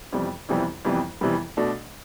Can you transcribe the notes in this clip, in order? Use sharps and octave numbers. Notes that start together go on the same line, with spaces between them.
F2 C3 E3 G3 B3
F2 C3 E3 G3 B3
F2 C3 E3 G3 B3
F2 C3 E3 G3 B3
B2 A3 D4